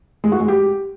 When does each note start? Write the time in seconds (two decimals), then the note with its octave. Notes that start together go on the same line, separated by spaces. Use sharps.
0.24 G#3
0.32 F#4
0.40 G#3
0.48 G4